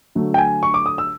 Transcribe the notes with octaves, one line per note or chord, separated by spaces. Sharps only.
D3 F#3 A3
G5
G#5
C#6
D6
D#6
E6